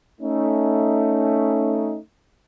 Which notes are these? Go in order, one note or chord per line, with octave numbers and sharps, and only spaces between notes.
A3 C#4 D#4